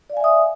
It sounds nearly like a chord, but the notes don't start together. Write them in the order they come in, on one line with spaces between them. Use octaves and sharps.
D5 F5 G#5 E5 D#6